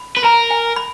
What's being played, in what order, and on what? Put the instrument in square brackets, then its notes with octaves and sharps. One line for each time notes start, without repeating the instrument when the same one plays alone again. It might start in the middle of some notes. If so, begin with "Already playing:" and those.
Already playing: [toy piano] B5
[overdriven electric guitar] B4
[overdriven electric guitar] A#4 [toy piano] A#5
[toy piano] G#5
B5